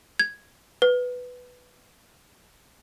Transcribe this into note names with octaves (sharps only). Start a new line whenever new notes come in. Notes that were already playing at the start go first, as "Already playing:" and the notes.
G#6
B4